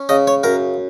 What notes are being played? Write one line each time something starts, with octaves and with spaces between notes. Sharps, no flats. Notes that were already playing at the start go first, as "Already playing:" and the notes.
Already playing: C#4
C#3 D#5
C#5
F#2 A#4